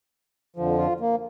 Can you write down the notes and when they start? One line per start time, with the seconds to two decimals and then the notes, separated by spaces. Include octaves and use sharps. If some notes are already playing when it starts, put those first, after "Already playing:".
0.56 F2 D3 F3
0.78 F4
1.00 A#3